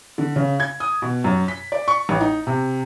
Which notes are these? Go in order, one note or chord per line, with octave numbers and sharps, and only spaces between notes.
D3
C#3
G#6
D#6
B2
F#2
B6
D5
C#6
A1
D#4
C3